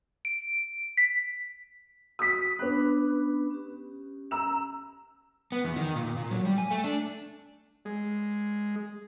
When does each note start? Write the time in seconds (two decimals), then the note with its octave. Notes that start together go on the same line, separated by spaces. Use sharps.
0.25 D7
0.97 B6
2.19 F#4 D#6 B6
2.59 B3 C#4 D4 B4 F#6
3.51 C#4 G4
4.31 A#5 E6 E7
5.52 B3
5.64 E2
5.76 D#3
5.96 A#2
6.16 A#2
6.31 F#3
6.45 G3
6.58 G#5
6.71 A3
6.84 D4
7.85 G#3